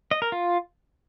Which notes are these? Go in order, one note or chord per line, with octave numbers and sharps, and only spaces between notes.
D#5
A#4
F4